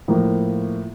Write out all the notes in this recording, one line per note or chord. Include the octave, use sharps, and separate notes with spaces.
A2 F3 A#3